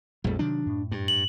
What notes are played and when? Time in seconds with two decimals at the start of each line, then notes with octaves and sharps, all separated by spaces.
0.24 A#1 F2 G3 A3
0.39 C3 D#3 F#3 D4
0.66 F#2 A2
0.91 G2
1.08 F#7